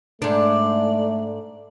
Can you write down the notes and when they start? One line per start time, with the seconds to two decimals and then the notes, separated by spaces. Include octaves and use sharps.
0.22 G#2 A3 D4 D5